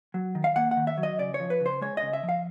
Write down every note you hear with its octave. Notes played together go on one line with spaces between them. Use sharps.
F#3
D#3
F5
A#3 F#5
F#5
D#3
E5
F#3
D#5
C#3 D5
C#5
F3
B4
C#3
C5
G#3 C#5
D#5
C#3
E5
F3
F5